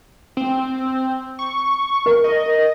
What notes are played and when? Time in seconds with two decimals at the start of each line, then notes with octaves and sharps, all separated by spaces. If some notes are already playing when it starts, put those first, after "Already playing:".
0.37 C4
1.39 C#6
2.06 A#4
2.24 D#5